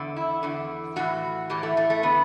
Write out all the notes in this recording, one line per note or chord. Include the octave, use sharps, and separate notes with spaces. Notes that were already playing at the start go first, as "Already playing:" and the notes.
Already playing: E2 D3
E4
E2 D3
A2 E3 F#4
A2 E3 G4
A3
A3
A3
D3 B3